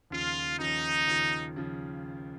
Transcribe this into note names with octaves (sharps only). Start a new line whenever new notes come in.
D#2 C#3 F3 F4
D#2 C#3 F3 D#4
D#2 C#3 F3
C#3 F3